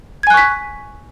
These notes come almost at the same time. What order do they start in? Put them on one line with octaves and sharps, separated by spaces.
G#6 G#5 F#6 C#6 B6